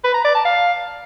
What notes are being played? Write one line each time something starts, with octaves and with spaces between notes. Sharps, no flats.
B4
A#5
D5
A5
F5